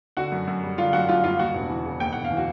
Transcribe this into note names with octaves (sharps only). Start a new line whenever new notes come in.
D3 F#4 F#5
F#2
F#2
G3
D3 F4 F5
F#2 F#4 F#5
F#2 F4 F5
G3 F4 F5
D#2 F#4 F#5
E1
E3
C#3
D#2 G5
E1 F#5
F5
E3
F#4